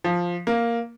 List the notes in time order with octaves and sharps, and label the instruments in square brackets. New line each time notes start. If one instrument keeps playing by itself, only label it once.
[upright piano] F3
A#3